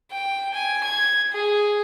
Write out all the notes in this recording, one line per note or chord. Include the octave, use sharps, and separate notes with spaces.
G5
G#5
G#6
G#4